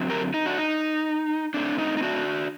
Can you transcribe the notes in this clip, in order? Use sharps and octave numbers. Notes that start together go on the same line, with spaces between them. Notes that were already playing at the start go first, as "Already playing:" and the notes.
Already playing: F#2 D3 F#3 C4
G4 A#4
D#4
D4 F#4
D#4
A2 A3 C4 D4
D#4
D#4
D4 F#4